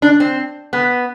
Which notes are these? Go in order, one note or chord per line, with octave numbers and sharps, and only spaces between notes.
D4
C4
B3